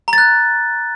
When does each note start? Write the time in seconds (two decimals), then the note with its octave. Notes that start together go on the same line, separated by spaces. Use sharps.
0.08 A#5
0.13 A6
0.18 F#6